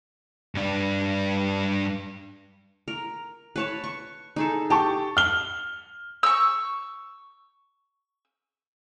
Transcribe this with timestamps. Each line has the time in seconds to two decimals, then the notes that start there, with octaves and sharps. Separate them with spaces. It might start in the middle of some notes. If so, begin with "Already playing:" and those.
0.55 G2 D4
2.88 A#4
3.56 B4 C#5 A5
3.84 C#6
4.36 D#4 G#4 A4
4.70 G4 G5 A5 C#6
5.17 F6 G7
6.23 C#6 E6